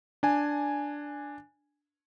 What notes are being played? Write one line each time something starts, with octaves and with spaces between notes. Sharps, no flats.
D4 G#5